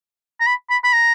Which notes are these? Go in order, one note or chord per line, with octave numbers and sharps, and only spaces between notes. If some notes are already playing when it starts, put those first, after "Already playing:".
A#5
B5
B5
B5
A#5